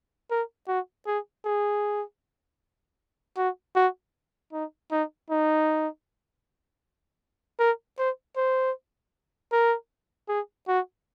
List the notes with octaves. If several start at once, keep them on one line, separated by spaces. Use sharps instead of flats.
A#4
F#4
G#4
G#4
F#4
F#4
D#4
D#4
D#4
A#4
C5
C5
A#4
G#4
F#4